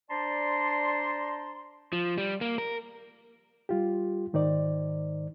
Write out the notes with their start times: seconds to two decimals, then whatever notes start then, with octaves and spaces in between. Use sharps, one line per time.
0.11 D4 C5 D5 A5 A#5 C6
1.93 F3
2.18 G3
2.41 A#3
2.58 A#4
3.69 G3 F4 G4
4.33 G#2 D#3 D#4 C5 D5